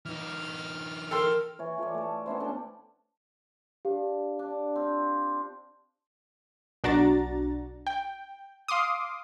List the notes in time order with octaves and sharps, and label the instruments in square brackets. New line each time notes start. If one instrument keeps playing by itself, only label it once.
[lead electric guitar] E3 D#4 [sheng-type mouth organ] F6
[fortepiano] A4 G5 C6 [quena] A#4
[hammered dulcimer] E3 C#5
F4 A4 C#5 D5
A3 A4
B3 C#4 E4 C5
D4 A4 D5 G5
[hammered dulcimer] D4 [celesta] G4 F5
[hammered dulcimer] D4
C4 F4
[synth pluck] B1 D4 F#4 A#5 A6
G5
F5 C6 D6 D#6